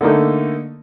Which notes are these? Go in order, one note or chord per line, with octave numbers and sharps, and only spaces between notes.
D3 A3 A#3 D#4